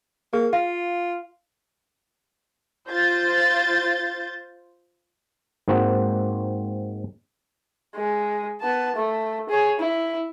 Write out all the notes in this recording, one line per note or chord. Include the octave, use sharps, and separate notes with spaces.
A#3 G#4
F4 F5
F4 C5 G6 A6
G#2 A#3 C4 F#4
G#3
B3 A5
A3
G#4 C#5
E4